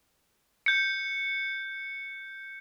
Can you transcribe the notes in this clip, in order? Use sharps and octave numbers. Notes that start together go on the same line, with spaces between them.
G6 C#7